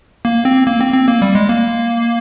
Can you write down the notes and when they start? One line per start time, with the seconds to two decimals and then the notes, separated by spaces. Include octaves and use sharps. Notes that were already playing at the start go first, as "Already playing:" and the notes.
0.25 A#3
0.45 C4
0.67 A#3
0.81 C4
0.94 C4
1.08 A#3
1.22 G3
1.35 G#3
1.49 A#3